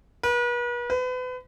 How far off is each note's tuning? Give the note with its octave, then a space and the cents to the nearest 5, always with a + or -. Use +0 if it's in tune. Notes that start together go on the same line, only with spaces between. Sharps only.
B4 -40
B4 +35